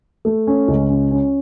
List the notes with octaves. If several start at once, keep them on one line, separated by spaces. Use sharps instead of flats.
A3
C#4
C#2
C#4
C#4